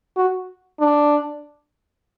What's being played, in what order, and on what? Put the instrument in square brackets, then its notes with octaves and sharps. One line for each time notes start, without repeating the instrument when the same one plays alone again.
[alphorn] F#4
D4